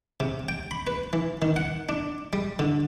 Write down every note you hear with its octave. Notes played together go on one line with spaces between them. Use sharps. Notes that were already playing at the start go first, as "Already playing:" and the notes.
C3
G5
B5
B4
E3
D#3
F#5
D4
G3
D3